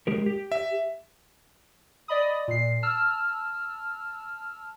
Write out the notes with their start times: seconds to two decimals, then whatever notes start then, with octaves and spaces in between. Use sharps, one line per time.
0.07 G#3 G4 A#4
0.26 G4
0.52 E5
2.08 D5 D#5 B5 D#6
2.48 A#2 C7
2.83 A5 E6 F6